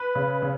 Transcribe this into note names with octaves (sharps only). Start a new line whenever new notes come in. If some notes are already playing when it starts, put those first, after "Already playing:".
Already playing: B4
C#3
C#3